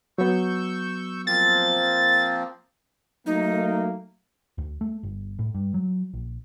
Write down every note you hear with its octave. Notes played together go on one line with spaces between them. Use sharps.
F#3 B3 C#6 E6 G6
F3 A#3 C4 A6
F#3 A3 A#3 D#4
D2
A3
G1
A2
G2
F#3
A#1